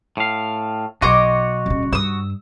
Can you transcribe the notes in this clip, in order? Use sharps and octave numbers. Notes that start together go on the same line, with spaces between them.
A2 F5
B1 F#4 C#5 D#5 C6 D6
D#1 C#3
G2 D#6 E6